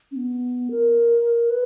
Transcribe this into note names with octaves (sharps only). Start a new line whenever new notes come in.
C#4
B3
A#4
B4